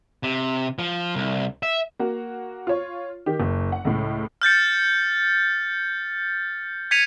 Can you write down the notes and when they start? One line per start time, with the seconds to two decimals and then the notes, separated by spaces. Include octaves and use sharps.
0.23 C3
0.79 F3
1.15 C2
1.63 E5
1.99 A#3 F#4
2.67 F4 C#5
3.26 D#3 G4
3.40 F#1
3.72 F#5
3.85 C#2 A2
4.42 F6 G6 A6 C#7
6.91 G#6 B6 C#7 D#7 F7